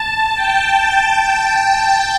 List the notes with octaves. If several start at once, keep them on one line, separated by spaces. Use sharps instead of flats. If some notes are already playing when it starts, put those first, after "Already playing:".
Already playing: A5
G5